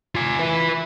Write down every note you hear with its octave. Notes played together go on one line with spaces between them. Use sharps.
F4 G#5
E4 B4